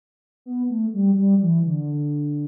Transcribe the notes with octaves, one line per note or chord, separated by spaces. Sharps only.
B3
A3
G3
G3
E3
D3